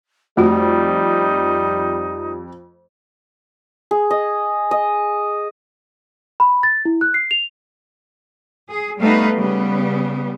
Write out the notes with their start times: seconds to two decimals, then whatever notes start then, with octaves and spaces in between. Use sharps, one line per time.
0.37 F2 G3 A3 D#4 F#4
3.91 G#4
4.11 D#5
4.71 D#5
6.40 B5
6.63 A6
6.85 E4
7.01 F#6
7.14 C7
7.31 F7
8.69 G#4
8.99 G3 A3 B3 D#4 B4 F5
9.38 C#3 G3 B3